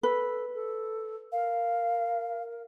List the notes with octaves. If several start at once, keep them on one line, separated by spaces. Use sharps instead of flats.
A4 B4
A4
A#4 F5